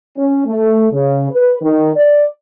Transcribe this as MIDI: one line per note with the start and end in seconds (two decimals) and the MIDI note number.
0.17 0.46 61
0.46 0.85 57
0.92 1.28 49
1.31 1.56 71
1.61 1.89 51
1.96 2.25 74